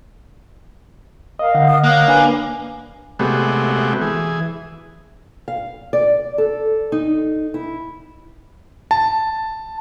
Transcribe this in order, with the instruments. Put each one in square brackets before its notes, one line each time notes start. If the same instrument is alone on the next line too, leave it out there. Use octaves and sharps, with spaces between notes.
[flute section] A#4 F5 [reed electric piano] D#5
[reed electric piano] D3 D#5 F#5
[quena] D#6
[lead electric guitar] A#3 [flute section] C#5 F5 [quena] F#6
[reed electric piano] D4 B4 [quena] G#5
[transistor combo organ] C3 G#3 A3 B3 F#4 G4
E3 G#4
[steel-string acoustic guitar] F5
D5
A4
D#4
E4
[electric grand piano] A5